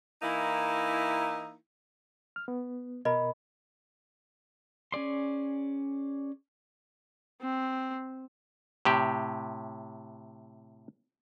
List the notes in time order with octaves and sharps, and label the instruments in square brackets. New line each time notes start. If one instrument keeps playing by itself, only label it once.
[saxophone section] E3 A#3 D#4 E4
[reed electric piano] F6
B3
[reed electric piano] B2 A#4 [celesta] D#5 B5
[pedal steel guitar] C#4 G#4 D5 C6
[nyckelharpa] C4
[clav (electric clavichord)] A2 C3 G4